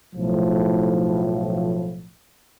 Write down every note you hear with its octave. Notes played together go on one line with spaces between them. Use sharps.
B1 A2 F3